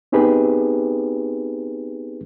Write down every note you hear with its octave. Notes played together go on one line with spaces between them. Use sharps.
B3 C4 D#4 G4 G#4 B4